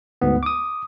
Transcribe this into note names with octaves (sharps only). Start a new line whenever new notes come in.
D2 G#2 B3
D6 D#6